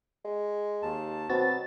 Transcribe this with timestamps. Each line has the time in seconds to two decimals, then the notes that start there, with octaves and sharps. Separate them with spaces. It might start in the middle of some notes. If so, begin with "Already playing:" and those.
0.25 G#3
0.82 D#2 A5
1.29 B2 F#3 C4 F#4 A6